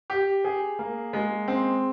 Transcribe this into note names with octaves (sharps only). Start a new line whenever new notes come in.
G4
G#4
A#3
G#3
C4